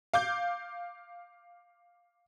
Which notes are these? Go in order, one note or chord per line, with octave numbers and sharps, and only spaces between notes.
F5 D6 G6